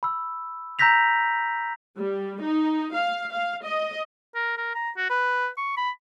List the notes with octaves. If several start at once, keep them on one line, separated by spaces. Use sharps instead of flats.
B5 E6
A#5 E6 G6 A#6 B6 F7
G3
D#4
F5
F5
D#5
A#4
A#4
A#5
F#4
B4
C#6
B5